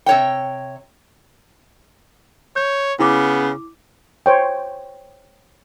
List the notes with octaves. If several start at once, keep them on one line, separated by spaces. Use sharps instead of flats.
C3 C#5 G5
C#5 G6
C#3 B3 E4 D6
C5 C#5 G5